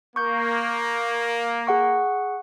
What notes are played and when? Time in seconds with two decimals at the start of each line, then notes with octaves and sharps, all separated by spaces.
0.16 A#3 C#6 G6
1.67 G#4 F#5 C#6